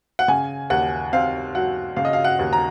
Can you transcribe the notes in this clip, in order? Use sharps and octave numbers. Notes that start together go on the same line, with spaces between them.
F#5
C#3 G#5
D#2 F#5
C4 F5
F#3 F#5
C#3 F5
D#5
F5
F#5
D#2
A#5